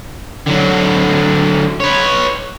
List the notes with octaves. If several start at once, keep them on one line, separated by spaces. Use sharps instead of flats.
D3 F#3
B4 C#5